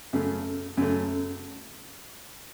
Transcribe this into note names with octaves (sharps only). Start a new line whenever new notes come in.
F#2 C#3 A3
F#2 C#3 A3